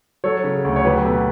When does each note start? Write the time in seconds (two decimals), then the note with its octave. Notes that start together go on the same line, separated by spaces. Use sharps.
0.24 F#3 A4 C#5
0.44 C#3
0.65 D2
0.76 C#5
0.85 F#3 G4 B4
1.05 B2 A4